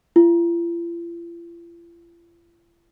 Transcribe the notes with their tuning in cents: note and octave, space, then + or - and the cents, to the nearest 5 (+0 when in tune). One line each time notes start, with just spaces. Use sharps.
F4 -45